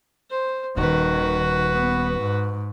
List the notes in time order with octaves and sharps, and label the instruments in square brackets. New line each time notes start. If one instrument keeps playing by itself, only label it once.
[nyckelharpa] C5
[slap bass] D#1 [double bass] D#3 [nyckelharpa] F#4 B4
[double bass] B3
G#2